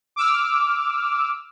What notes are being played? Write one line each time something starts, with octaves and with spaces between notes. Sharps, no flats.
D6 E6 F6